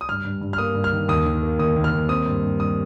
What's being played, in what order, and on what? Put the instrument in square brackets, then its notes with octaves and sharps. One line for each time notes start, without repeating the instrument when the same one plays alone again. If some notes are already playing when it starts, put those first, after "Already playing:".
[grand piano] D#6
G2 F6
G2
G2
F6
A#3 D#6
G2
F6
D#3
D#2 D#6
D#3
A#3
D#2 D#6
D#2
F6
D#2
C4 D#6
G2
G2
G2 D#6